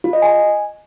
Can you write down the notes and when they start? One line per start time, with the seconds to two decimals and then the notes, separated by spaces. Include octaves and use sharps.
0.04 F4
0.13 D#5
0.22 G#5